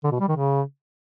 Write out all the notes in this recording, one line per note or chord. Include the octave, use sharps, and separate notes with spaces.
D3
B2
G3
D#3
C#3